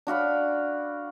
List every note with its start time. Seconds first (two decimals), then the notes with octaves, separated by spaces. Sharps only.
0.07 D4 F#4 F5 B5